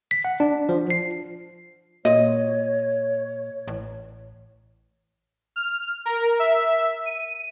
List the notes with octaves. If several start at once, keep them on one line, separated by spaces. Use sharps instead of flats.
B6
F#5
D4
F3
C7
A#2 C#5 D#5
A1
F6
A#4
E5
D#7